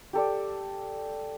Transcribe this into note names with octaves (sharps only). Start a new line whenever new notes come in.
G4 A4 D5